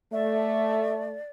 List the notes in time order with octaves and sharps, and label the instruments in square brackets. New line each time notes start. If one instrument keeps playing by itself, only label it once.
[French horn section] A3 [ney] D5 [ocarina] E5